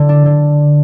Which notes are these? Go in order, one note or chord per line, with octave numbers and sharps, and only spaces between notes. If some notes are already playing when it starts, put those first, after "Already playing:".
Already playing: D3
D4
D3